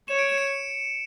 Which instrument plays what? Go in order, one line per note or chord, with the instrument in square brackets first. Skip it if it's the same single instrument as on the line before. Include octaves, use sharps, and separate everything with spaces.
[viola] C#5 [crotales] E7
[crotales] D7
E7
C#7